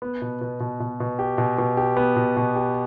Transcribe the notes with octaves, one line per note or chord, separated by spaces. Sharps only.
B3
B2
B2
B2
B2
B2
G4
B2
B2
G4
B3
B2
B2
G4